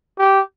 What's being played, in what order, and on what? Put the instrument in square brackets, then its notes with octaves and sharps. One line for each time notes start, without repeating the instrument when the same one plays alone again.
[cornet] G4